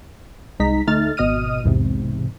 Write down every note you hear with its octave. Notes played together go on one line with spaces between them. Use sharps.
C2 G#3 D#4 A#5 B6
D2 A3 D#4 F6 A6
G#1 B2 D#5 D#6 F6 D#7
B1 E2 G#2 C3